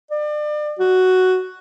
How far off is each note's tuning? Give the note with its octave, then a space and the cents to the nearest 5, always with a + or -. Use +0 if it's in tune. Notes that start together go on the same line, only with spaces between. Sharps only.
D5 +35
F#4 +5